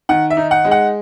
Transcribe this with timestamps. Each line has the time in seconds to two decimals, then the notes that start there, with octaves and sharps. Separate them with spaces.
0.09 D#3 F#5
0.30 E5
0.37 D#4
0.51 F#5
0.65 G#3
0.71 F#5